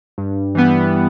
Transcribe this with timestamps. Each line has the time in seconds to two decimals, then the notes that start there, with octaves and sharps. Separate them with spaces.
0.18 G2
0.55 E3 G3 B3